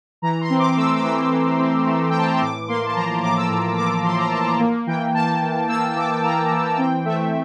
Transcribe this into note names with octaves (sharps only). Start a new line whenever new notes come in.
E3 A#5
C6
C4
D6
A3 E6
D6
E3 E6
E3
C4
A3
G5
E3 A5
A#5
C6
A2 D6
A#3 C6
A5
F3 A#5
C6
A2 D6
E6
A2
A#3 D6
F3 C6
A#5
A2 A5
A#5
A#3
E3 G5
A#3 A5
E3
A#3 E6
E3 D6
A#3 A#5
E3
C4 G5
A3 E5